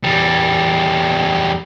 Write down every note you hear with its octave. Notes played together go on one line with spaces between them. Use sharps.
E2 G3